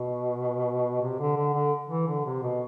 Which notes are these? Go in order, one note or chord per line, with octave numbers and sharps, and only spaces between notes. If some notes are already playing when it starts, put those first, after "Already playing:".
Already playing: B2
C3
D3
D3
D3
E3
D3
C3
B2